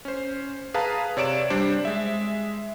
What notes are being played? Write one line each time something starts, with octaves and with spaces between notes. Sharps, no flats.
C#4 C5
G#4 B4 F5 A5 A#5
C3 C#5 D5 D7 E7
G3 D4 C5
G#3 E5